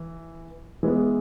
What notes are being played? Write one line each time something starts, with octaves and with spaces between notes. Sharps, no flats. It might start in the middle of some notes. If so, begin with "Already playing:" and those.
Already playing: E3
E3 G#3 B3